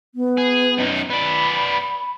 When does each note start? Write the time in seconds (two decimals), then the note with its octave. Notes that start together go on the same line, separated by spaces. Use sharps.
0.15 B3
0.37 G#4
0.78 F#2 D#4
1.10 B3 D5 B5